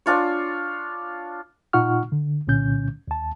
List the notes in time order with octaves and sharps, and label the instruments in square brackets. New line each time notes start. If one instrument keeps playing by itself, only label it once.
[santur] D4 F4 C#5
[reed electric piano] A#2 D#4 F4 F#5 C#6 F6
D3
C2 A#2 D3 C#4 G6
D#2 A5